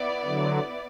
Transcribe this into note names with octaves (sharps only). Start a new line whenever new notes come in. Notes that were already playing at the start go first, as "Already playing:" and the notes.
Already playing: B3 E4 D5
D3 F#3